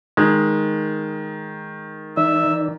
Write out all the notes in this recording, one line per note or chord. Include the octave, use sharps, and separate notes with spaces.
D#3 G#3
E3 D#4 D5 E5